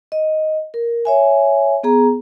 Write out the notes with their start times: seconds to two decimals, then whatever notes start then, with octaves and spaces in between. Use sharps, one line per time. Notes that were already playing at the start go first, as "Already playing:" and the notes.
0.12 D#5
0.74 A#4
1.05 C#5 E5 G#5
1.83 B3 G#4 A#5